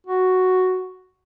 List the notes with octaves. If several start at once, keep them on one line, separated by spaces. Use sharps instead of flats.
F#4